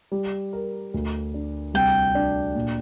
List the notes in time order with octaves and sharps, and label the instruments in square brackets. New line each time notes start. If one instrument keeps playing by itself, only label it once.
[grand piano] G3
A#4
D2
D4
[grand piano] C2 [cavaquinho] G5
[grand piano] D4
A#2